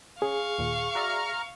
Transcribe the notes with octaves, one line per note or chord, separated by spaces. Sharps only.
C#4 G#4 F5 C#6
D#2 A#2
F#4 D5 E5 A#5 F6